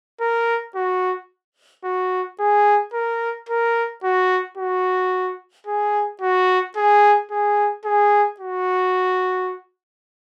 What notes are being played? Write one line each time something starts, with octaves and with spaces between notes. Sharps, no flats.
A#4
F#4
F#4
G#4
A#4
A#4
F#4
F#4
G#4
F#4
G#4
G#4
G#4
F#4